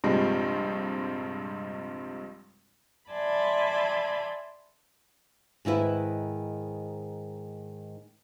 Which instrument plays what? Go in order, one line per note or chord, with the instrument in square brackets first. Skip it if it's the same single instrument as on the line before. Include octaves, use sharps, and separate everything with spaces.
[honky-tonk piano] A#1 G2 C3 F3 G3 G#3
[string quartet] D5 E5 G#5 A5 B5 C6
[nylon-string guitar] G#2 D#3 E4 B4